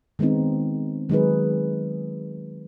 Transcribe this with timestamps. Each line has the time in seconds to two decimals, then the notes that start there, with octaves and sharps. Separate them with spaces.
0.19 D#3 G#3 B3 C4 D#4
1.09 D#3 F#3 G#3 D#4 G#4 B4